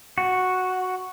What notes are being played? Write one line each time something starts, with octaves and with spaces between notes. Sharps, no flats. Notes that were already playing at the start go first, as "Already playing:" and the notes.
F#4